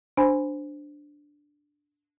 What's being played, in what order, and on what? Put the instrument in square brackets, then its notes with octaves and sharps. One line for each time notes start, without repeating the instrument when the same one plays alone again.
[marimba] D4 C5 G#5 B5